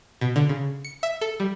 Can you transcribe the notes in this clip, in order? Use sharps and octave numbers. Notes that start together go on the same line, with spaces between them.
B2
D3
C#3
C#7
E5
A4
G3